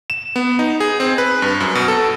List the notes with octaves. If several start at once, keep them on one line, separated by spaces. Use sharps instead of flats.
E7
B3
D#4
G#4
C4
B4
G2
F#2
B2
A4